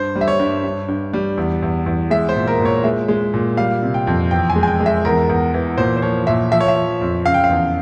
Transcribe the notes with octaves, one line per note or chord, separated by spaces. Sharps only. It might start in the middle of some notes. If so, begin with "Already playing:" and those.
Already playing: G2 C5
G3
E5
C#5
G2
G2
G2
G3
E2
E2
E2
G#3 E5
C5
A#2
A#4
A#2
C#5
G#3 E5
G#3
A#2
G3 F5
C3
G5
F2
E2 G5
G#5
G#3
G#5
G5
G#3
E5
E2 A#4
E2
E3
A#2 C5
C5
F3 C#5
A#2 E5
F3 E5
C#5
E5
F3
F2
C#3 F5
G5
F5
E2